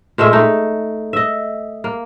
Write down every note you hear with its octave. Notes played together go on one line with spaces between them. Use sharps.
A#2 G#3 A3 E5
A3 D#4
D#5 E5
A#3